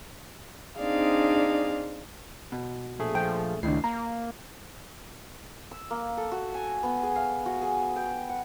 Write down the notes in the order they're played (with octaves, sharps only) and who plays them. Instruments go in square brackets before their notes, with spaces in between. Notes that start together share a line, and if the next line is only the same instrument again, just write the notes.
[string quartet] C4 D4 D#4 G#4 D5 F5
[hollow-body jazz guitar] B2
[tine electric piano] A#1 A3 G#4
[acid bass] F3 [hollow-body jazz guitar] G5
[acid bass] C#2 [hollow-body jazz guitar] A2 D#3 D4 [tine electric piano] C7
[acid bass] A#3 [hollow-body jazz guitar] A#5
[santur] E6
A#3
A4
F#4
G#5
B3
G#4
F5
F#4
G#4
G5
F#5